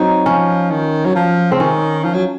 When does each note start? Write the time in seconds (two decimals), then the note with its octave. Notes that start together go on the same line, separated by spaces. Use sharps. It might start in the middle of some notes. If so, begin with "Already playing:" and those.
Already playing: F#3 C4 D#4
0.26 F3 C#4
0.71 D#3
1.05 F#3
1.15 F3
1.52 C#3 C4
1.60 D#3 C#4
2.04 F3
2.14 F#3